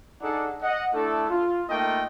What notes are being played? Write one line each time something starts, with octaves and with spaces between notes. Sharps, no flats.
D4 D#4 G#4 A4 D5 F#5
D#5 F#5
A3 D4 E4 A4
F4
A3 A#3 D#4 F4 D#5 G5